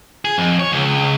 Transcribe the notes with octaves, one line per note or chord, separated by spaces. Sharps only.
G#4
F2
C#5
C#2